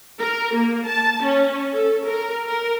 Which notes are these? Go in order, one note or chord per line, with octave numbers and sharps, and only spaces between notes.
A#4
A#3
A5
C#4
A4
A#4
A#4